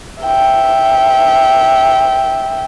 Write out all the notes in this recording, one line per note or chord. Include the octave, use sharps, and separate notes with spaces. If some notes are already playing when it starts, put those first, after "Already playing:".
E5 G5